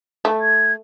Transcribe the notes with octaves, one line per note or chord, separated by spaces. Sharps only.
A3
G#6